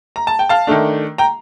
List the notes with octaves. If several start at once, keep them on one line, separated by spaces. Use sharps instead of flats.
A#5
A5
G5
F5 A5
D#3 A3 D4
G5 A#5